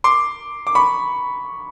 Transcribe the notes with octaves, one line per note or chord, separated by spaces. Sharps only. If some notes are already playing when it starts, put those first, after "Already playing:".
C6 D6
D6
B5 C#6